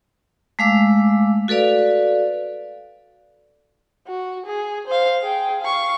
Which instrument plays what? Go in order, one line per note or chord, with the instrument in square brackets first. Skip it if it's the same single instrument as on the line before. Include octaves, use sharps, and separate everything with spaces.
[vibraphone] G#3 A3 F5 D6 E6
F#4 A4 B4 D5 F5
[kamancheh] F#4
G#4
C5 F5
G#4 G5
F5 C#6